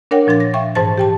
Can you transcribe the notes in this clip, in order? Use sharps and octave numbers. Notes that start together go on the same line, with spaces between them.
D4 A#4 C#5 F#5 G5
A#2 F3 D4 C6 A6
A#6
E5 F5 G5 C#6
G#2 E3 C5 A5 A6
G4 G5 A5